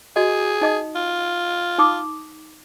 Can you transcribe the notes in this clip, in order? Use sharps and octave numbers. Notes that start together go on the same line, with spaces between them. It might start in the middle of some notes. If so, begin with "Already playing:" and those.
F#4 G#4 D#5
D#4 D#5 D#6
F4
D#4 D6 D#6